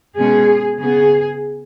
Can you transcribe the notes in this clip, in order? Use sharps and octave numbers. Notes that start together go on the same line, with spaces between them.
B2 G#3 C#4 G#4
C#3 B3 G#4